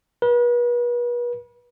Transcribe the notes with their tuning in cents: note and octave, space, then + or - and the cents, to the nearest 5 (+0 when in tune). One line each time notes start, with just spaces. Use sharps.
B4 -40